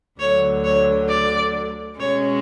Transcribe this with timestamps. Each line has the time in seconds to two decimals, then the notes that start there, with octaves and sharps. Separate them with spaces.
0.19 D2 D3 F#3 C#5
0.64 C#5
1.09 D5
2.00 B2 G#3 C#4 C#5